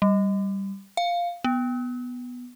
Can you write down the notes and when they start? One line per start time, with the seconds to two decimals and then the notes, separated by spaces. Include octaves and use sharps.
0.02 G3
0.97 F5
1.44 B3